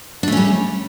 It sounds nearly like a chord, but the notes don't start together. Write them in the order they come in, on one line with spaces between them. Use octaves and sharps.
D4 A3 C#4 G3